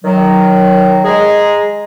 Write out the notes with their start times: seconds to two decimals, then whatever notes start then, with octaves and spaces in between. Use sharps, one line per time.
0.04 D#3 F#3
1.05 G#3 G#4 A#5